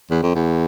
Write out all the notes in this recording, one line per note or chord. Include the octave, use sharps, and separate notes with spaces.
E2
F2
E2